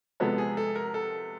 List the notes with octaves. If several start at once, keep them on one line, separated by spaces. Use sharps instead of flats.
C3 F3 G#3 B3 A4
G#4
A4
A#4
A4